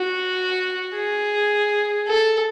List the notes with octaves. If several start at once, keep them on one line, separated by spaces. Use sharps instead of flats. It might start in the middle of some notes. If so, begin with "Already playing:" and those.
Already playing: F#4
G#4
A4